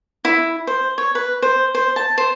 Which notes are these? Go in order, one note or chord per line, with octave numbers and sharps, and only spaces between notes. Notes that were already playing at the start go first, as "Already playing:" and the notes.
E4
C5
C#5
B4
C5
C5
A5
C5